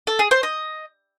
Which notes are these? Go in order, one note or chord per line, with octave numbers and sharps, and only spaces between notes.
A4
G#4
C5
D#5